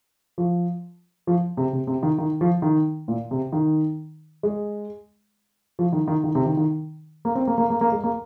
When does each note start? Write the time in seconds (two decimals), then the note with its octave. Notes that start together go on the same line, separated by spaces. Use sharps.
0.38 F3
1.27 F3
1.57 C3
1.73 C3
1.87 C3
2.03 D#3
2.18 D#3
2.41 F3
2.62 D#3
3.08 A#2
3.31 C3
3.53 D#3
4.43 G#3
5.79 F3
5.93 D#3
6.08 D#3
6.24 D#3
6.35 C3
6.46 D#3
6.57 D#3
7.25 A#3
7.35 C4
7.47 A#3
7.58 A#3
7.70 A#3
7.81 A#3
7.92 G#3
8.03 A#3